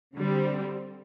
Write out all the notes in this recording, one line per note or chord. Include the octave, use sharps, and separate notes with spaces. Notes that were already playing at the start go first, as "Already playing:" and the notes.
D3 G3 C4